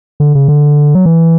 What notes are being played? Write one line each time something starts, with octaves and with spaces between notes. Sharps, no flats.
D3
C#3
D3
F#3
E3